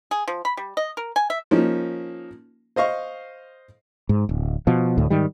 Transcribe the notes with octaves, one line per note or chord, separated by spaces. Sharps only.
G#4
F3
B5
G3
D#5
A#4
G#5
E5
F3 A#3 C#4 D#4
C5 D#5 F5 C#6
G#2
D1
B2 F3
D2 A2
G#2 D#3 G3